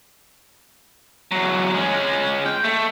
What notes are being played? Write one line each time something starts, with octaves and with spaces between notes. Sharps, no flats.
E2 F#3
G#3 C#4
G5
A3